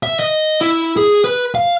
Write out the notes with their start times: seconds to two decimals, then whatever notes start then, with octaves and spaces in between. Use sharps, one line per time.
0.03 E5
0.19 D#5
0.61 E4
0.97 G#4
1.24 B4
1.55 F5